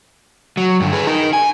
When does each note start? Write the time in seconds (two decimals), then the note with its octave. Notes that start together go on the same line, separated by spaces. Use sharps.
0.57 F#3
0.80 G2 D3
0.93 G#4 B4
1.07 D#4 A#4
1.33 G#5